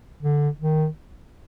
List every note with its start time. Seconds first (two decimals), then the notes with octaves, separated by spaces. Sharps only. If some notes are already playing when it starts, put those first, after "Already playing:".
0.23 D3
0.60 D#3